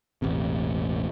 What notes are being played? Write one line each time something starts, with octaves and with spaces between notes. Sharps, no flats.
E1 A1 C3